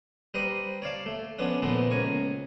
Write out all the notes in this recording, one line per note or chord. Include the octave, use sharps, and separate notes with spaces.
G3 B4 C5 A#5 D#6
C#5 D5 F5 A5
A3
F3 B3 C#4 D4
A#2 E3 F3 A3 B3
C#2 A#4 G#5 C#6